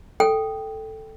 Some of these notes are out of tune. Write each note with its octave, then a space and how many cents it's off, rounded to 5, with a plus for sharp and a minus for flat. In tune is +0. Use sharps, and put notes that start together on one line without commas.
A4 +0 G5 +0